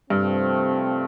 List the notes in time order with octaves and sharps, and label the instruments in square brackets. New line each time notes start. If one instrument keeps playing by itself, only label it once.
[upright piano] G2 [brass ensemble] C3 F3 A3 C4